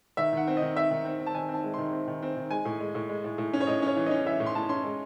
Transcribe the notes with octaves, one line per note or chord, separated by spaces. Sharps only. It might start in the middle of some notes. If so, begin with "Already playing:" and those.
D#3 E5
D#3 F#5
C4
D#3 D#5
C4 E5
D#3
C4
C4
A5
D#3 G#5
C4
A5
G#3
D#3 C6
C4
D#3
C4
D#3
G#3 G#5
A2
G#3
A2
G#3
A2
A2
C#4
C#5
A2 D#5
C#4 C#5
E3
C#4 D#5
E3 E5
A2
C6
A2 A5
C#4 C6
G#3